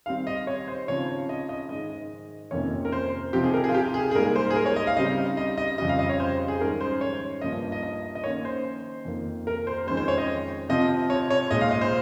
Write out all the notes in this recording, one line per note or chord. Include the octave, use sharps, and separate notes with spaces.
D#3 G3 C4 F5
D#5
C#5
C5
C#3 F3 C4 D#4 C#5
D#5
D#5
G#2 D#3 G#3 D#5
F2 C3 D#3 A#3 C#4 C#5
A#4
C5
C3 F3 C4 D#4 G4
G#4
A#4
G#4
F4
G4
G#4
G#4
G#2 G3 A#3 A#4
C5
G#4
A#4
C#5
D#5
F5
C#3 G3 C4 D#4 D#5
D#5
D#5
F2 C#3 G3 D#5
F5
D#5
C#5
C5
G#4
G#2 D#3 G3 C#4 A#4
C5
C#5
G2 F3 A#3 D#4 D#5
D#5
D#5
D#5
D#5
D#3 A#3 C#4 C#5
C5
F2 D#3 A#3
A#4
C5
F2 D#3 G#3 C#4 C5
C5
C#5
D#5
C3 F3 C4 D#5
C#5
C#5
A#2 G#3 D#4 D#5
F5
D#5
C5